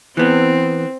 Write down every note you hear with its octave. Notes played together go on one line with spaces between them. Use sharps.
E3 B3 C4